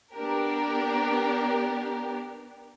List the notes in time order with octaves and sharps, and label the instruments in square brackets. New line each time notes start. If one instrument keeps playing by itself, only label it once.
[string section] B3 D4 G4 A#4